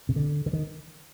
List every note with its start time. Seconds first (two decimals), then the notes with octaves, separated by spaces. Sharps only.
0.09 C3
0.16 D3
0.46 D3
0.53 D#3